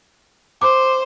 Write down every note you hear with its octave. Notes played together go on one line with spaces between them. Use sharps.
C5 D6